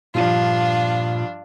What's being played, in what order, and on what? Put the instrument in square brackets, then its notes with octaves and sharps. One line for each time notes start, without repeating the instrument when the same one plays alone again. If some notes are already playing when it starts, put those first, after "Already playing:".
[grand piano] G2 F3 [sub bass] A#2 [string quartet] D4 F4